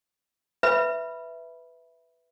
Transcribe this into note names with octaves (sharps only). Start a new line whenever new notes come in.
B4 E5 B5